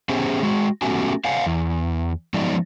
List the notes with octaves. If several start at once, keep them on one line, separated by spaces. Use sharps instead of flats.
B3 C#4 G4 G#4 C5 E5
G#3 F#4
A3 B3 C#4 F#4 G4 G#5
C5 D5 F5 F#5 G#5
E2
F3 F#3 G#3 B3 D#4 D5